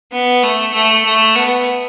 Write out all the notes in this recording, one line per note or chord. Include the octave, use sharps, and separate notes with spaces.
B3
A3
A3
A3
B3